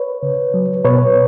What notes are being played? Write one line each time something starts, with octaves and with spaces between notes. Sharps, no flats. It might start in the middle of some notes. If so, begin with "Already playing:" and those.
Already playing: B4 C#5
C#3
F#3
B2 B4 C#5